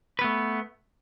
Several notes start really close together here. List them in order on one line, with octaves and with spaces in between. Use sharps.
B4 B3 A3